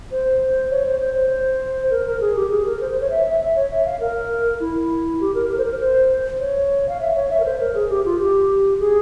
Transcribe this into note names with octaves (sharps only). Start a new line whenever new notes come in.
C5
C#5
C5
C5
C5
A#4
A#4
G#4
G4
G#4
A#4
C5
C5
C#5
E5
E5
E5
C#5
E5
F5
A#4
E4
G4
A#4
A#4
C5
A#4
C5
C#5
F5
E5
C#5
E5
A#4
C5
A#4
G#4
G4
F4
G4
G#4